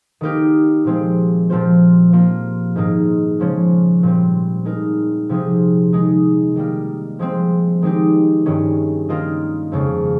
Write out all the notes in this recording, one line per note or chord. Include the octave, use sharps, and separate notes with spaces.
D#3 A#3 D#4 G4 A#4
A#2 F3 G#3 C4 G4
A#2 F3 C4 F4 C5
F3 A#3 F4
G#2 D#3 A#3 D#4
C#3 F3 G#3 C#4
A#2 G3 C4
G#3 D#4 A#4
C3 F3 C4 D#4 G#4
D#3 G#3 D#4
D#3 G3 A#3
F3 G#3 C4
D#3 G#3 C4 D#4 G4
G2 D#3 G#3 C#4
D#3 A#3 F4 A#4 D#5
F2 C#3 G#3